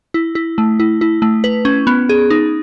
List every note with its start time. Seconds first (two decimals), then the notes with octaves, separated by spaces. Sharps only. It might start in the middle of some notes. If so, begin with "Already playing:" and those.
0.14 E4
0.35 E4
0.58 A3
0.80 E4
1.01 E4
1.22 A3
1.44 B4
1.65 C#4
1.87 B3
2.09 G#4
2.30 D#4